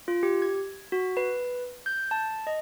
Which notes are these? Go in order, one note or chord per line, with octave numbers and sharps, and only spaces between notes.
F4
G4
G#6
F#4
B4
G6
A5
D#5